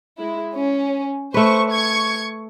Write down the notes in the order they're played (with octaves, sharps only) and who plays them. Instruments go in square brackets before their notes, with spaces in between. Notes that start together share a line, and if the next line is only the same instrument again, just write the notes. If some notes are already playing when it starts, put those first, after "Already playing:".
[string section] G#3 E4
C#4
[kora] A3 B4 [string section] C5 C#6
[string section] C#6 G#6 C#7